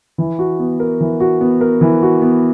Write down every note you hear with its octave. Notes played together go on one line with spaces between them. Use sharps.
E3
F#4
B3
A#4
E3
F#4
B3
A#4
E3
F#4
B3